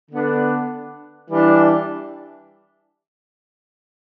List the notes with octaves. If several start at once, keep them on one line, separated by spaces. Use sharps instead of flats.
D3 B3 D4
E3 G3 D4